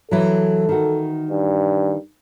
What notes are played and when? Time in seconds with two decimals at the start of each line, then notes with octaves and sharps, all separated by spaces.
0.11 E3 F#3 A4
0.69 D#3 F#4
1.30 G2